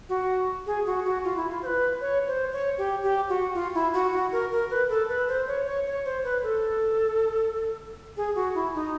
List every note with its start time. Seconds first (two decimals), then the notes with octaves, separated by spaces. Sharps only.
0.09 F#4
0.66 G#4
0.86 F#4
1.05 F#4
1.24 F4
1.37 E4
1.49 F4
1.63 C5
1.66 B4
2.01 C#5
2.27 C5
2.52 C#5
2.78 G4
3.03 G4
3.29 F#4
3.54 F4
3.74 E4
3.94 F#4
4.12 F#4
4.32 A#4
4.52 A#4
4.70 B4
4.89 A4
5.09 B4
5.28 C5
5.47 C#5
5.66 C#5
5.86 C#5
6.05 C5
6.24 B4
6.43 A4
8.17 G#4
8.35 F#4
8.55 E4
8.74 D#4